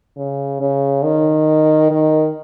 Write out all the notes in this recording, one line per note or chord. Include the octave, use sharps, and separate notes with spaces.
C#3
C#3
D#3
D#3